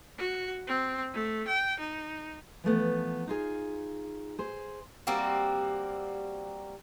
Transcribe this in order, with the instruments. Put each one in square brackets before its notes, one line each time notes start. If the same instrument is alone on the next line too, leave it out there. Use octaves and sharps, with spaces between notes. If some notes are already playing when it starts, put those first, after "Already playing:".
[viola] F#4
C4
A3
G5
D#4
[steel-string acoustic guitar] E3 F3 A3 B3
D#4 F4 G#4
G#4 C5
[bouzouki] G3 A#3 C4 F#4